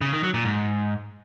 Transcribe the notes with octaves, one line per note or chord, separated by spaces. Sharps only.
C#3
D#3
F#3
A#2
G#2